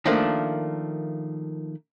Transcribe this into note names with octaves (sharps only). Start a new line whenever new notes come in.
D#3 F3 A3 A#3 D4